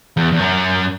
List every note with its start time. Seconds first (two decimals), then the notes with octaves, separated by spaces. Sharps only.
0.17 E2
0.32 E2
0.39 F#2